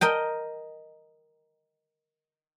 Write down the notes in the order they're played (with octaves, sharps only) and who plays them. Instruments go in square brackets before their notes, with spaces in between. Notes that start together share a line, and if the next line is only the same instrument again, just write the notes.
[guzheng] A#4 D#5 G5